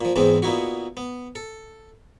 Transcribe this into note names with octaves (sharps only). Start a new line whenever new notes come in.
A#2 F3
E2 G#2 E3 G#3 B3 C4
A#2 B3 D#4 E4 F#4
B3
A4